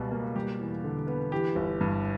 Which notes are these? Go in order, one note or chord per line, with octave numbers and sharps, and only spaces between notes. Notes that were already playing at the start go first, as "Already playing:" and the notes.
Already playing: C#2 B2 G3
A#3
G3 G4
E2
D3
B3
E3 G4
G1
G2